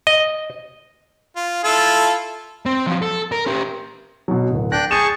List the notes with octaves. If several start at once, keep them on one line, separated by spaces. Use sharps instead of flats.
D#5
F4
E4 F4 A4
C4
F3 F#3
A4
A#4
C#4 G4
B2 F#3
D1
D4 G5 F#6 A#6
G#4 A5 C#6 G6 D#7 E7